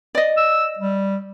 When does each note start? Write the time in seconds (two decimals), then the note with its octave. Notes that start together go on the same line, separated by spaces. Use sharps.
0.15 D5 D#5
0.37 E6
0.79 G3